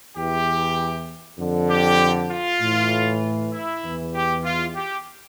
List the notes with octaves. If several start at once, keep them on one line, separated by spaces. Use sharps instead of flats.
E2 E3 G4
F2 D3
G4
F4
A2 E3
E4
E2 E3
G4
F4
G4